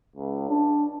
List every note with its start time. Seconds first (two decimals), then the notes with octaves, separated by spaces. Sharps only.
0.16 C#2
0.49 D4